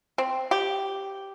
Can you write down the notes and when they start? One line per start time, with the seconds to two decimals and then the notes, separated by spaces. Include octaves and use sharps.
0.18 C4
0.51 G4